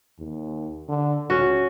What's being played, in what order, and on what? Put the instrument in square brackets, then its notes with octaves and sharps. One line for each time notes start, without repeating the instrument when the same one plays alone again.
[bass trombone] D#2
D3
[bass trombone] C#2 [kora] C#4 F#4